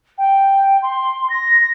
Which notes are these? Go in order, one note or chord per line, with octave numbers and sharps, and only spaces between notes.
G5
C6
A#6